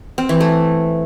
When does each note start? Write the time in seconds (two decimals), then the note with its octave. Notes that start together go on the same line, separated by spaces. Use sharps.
0.18 C4
0.29 E3
0.40 A3